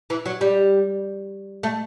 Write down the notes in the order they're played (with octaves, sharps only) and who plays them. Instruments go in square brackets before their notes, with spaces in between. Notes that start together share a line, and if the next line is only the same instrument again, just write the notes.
[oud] E3
F#3
G3
A3